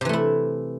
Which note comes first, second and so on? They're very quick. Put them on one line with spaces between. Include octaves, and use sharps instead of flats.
C3 E3 A3 E4